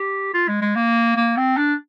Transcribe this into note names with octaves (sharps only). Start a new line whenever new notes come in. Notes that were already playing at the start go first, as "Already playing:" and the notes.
Already playing: G4
F4
G#3
G#3
A#3
A#3
C4
D4